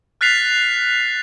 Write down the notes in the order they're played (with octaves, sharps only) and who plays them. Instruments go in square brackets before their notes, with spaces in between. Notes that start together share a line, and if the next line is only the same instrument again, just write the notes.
[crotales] F6 F#6 A6 B6 C7 F7